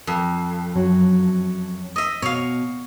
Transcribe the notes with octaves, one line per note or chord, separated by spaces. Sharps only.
F2
F#2 F#3
D#5 E5
B2 C#5 F5